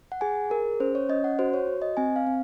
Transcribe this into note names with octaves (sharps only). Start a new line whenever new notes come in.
F#5
G#4 G#5
G#4 A#4
C#4 C5
C#5
C#4 D#5
F#5
F#4 C5
C#5
F#4
D#5
C4 G#5
F5
C4